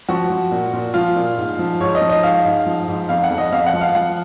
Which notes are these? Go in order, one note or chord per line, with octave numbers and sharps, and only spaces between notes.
F3 F#4
F3
A#2
A#2
F3 F4
A#2
G#2
F3
G#2 C#5
D#5
F3
D#5
G#2 F5
G#2
F3
G#2
F2 F5
F#5
F2
D#5
F2 F5
F#5
F3
F5
F3 F#5